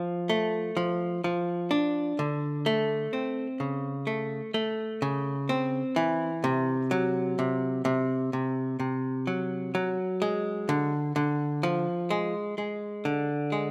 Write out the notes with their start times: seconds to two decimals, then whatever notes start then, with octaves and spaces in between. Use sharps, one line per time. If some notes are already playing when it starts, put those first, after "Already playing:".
Already playing: F3
0.30 A3
0.77 F3
1.24 F3
1.71 D4
2.19 D3
2.66 A3
3.13 C4
3.60 C#3
4.07 A3
4.54 A3
5.02 C#3
5.49 C4
5.96 E3
6.44 C3
6.91 F#3
7.39 C3
7.85 C3
8.33 C3
8.80 C3
9.27 F#3
9.75 F#3
10.22 G#3
10.69 D3
11.16 D3
11.63 F3
12.11 G#3
12.58 G#3
13.05 D3
13.52 G#3